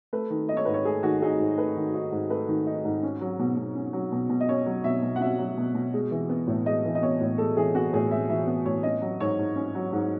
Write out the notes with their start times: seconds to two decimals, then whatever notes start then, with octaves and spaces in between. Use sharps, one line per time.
0.13 A3 B4
0.30 D#3
0.48 D#4 D#5
0.57 C#5
0.65 G#2 B4
0.74 C#5
0.85 A3 G#4
1.03 D#3 F#4
1.22 D#4 G#4
1.40 G#2
1.58 A3 B4
1.77 D#3
1.94 D#4
2.12 G#2
2.30 A3 B4
2.48 D#3
2.66 D#4
2.85 G#2
3.03 C#4
3.21 F#3
3.39 B2
3.57 B2
3.75 C#4
3.93 F#3
4.12 B2
4.29 B2
4.40 D#5
4.49 C#4 C#5
4.66 F#3
4.84 B2 E5
5.02 B2
5.16 F#5
5.20 C#4 E5
5.38 F#3
5.58 B2
5.75 B2
5.93 G#3
6.11 E3
6.29 B3
6.47 A2
6.66 G#3 D#5
6.85 E3
6.95 D#5
7.02 B3 C#5
7.21 A2
7.38 G#3 A4
7.57 E3 G#4
7.75 B3 F#4
7.93 A2 G#4
8.11 G#3 E5
8.29 E3 E5
8.47 B3
8.66 A2 C#5
8.83 C#4 D#5
9.02 F#3
9.20 G#2 C#5
9.39 G#2
9.56 C#4
9.75 F#3
9.92 G#2